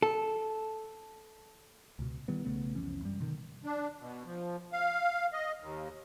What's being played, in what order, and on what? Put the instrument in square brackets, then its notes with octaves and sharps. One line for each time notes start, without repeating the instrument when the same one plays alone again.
[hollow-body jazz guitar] A4
[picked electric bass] C#2 B2
D#3 E3 G3 B3
B1 C#3 A3 B3
C2 F2 E3 C#4
F#2 G3
B2 D3 D#3
[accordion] D4
B2
F3
F5
D#5
D#2